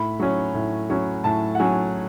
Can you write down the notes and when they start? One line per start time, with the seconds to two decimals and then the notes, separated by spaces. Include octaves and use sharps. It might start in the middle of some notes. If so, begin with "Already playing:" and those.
Already playing: A2 B5
0.20 F#3 C#4
0.54 A2
0.90 F#3 C#4
1.24 A2 A5
1.55 F#5
1.59 F#3 C#4 G#5